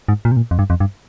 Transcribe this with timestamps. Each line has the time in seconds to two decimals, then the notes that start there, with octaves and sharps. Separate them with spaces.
0.08 G#2
0.25 A#2
0.32 C3
0.37 A#2
0.51 F2
0.59 G2
0.70 F2
0.80 G2